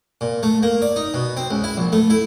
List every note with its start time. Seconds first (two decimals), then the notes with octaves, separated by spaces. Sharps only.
0.21 A#2
0.43 A3
0.63 A#3
0.82 D5
0.96 D#4
1.14 B2
1.37 C4
1.50 C#2
1.64 E4
1.77 A#1
1.92 A3
2.10 E4